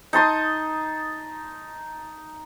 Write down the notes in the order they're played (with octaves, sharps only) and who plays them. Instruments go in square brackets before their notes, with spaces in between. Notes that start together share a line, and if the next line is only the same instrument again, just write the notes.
[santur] D#4 A5 C6 D#6